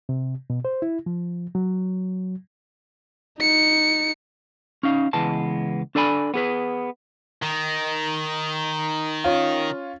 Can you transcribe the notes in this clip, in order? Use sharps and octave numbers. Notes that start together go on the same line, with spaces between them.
C3
B2
C5
E4
F3
F#3
D#4 C#7
C#4 D#4 F5
C#2 E3 G#3 B3 A5
D4 A4 D5 G#5 B5
B3 G#4 B4
D#3
C#4 F4